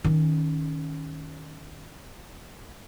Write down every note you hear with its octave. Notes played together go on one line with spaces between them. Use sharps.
D#3 C#4